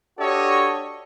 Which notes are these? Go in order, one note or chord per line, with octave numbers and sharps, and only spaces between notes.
D4 F#4 G4 A4 C#5 D#5